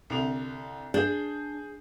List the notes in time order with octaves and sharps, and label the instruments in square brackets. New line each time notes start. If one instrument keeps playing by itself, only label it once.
[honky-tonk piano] C2 D3 F7
[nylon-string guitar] D4 [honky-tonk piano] G#4 G6